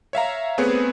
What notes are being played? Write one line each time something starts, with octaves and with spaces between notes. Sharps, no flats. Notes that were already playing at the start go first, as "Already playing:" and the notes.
C#5 E5 F5 A#5
A3 B3 C4 G#4 B4 C#5